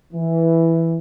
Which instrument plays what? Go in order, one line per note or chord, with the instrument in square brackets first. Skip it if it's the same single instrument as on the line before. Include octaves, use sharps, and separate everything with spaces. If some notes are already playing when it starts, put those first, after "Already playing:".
[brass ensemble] E3